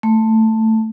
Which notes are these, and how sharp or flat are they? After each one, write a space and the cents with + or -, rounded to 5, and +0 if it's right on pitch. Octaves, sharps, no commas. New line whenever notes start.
A3 +10